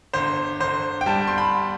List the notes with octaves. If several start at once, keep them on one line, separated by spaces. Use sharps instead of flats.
G1 C5
G1 C5
G5
G3 A5
C6
B5